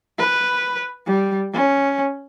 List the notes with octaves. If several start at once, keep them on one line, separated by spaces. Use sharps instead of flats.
B4
G3
C#4